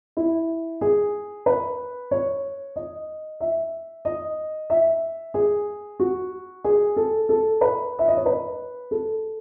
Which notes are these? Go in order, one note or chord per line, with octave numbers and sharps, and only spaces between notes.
E4
G#4
B4
C#5
D#5
E5
D#5
E5
G#4
F#4
G#4
A4
A4
B4
E5
D#5
C#5
B4
A4